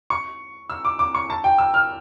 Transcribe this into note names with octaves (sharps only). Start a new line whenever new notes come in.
C#6
E6
D6
D6
C#6
A5
G5
E6
F6